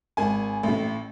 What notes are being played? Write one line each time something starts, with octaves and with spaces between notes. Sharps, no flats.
G#1 G#5
A1 A2